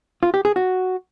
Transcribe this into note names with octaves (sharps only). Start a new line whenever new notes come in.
F4
G4
G#4
F#4